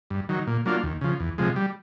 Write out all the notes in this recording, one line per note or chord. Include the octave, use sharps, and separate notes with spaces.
G2
D#3 F#3
A#2
F#3 A#3 D4 F4
D#2
C#3 F3
E2
C3 F3 G#3
G3